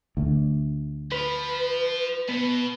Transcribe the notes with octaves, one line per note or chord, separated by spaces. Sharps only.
D2
F3 B4
B2 B3